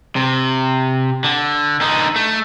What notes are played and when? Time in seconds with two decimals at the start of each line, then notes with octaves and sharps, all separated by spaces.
0.16 C3
1.24 D3
1.81 D3 D#4
2.16 A3